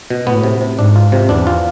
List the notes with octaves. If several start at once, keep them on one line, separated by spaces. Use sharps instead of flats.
B2
A2 B3
C3
C3
G#2 D4
F4
C3
E2 D4
F4